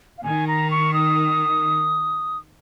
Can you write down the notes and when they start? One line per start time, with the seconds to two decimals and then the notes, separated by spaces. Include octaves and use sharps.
0.18 F5
0.23 D#3 G#5
0.48 A#5
0.71 C#6
0.94 D#6